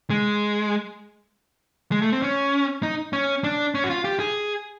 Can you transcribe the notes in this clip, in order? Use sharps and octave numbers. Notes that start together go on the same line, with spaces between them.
G#3
G#3
A3
C4
C#4
D#4
C#4
D4
C#4
F#4
F4
G4
G#4